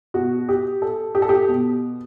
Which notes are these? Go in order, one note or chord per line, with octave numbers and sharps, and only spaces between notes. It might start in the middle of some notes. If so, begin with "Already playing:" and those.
B2 F#4
G4
A4
G4
A4
G4
B2